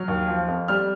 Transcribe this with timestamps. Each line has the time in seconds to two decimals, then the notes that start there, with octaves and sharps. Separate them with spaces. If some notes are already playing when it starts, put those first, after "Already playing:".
Already playing: F#3 F6
0.08 D#2
0.28 F3
0.48 F2
0.68 G3 F6